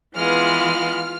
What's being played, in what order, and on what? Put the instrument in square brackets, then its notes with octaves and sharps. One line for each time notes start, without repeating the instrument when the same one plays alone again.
[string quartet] E3 G#3 B3 [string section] F4 F6